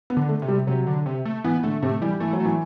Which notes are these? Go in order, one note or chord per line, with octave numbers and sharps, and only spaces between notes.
B3
D3
A3
C3
G3
C3 F#3
D3
C3
A3
E3 B3
D3 A3
C3 A3
E3 G3
E3 A3
F#3
A3
E3